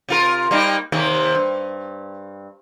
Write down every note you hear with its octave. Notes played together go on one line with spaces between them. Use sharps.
C3 F4 A#4
G3 A#3 D#4
D#2 C3 A#3
G2